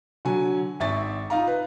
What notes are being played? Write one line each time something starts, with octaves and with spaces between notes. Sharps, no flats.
D3 F#3 G#5
G#1 E5 C#6 A6
D#4 F4 F5 A#5
B4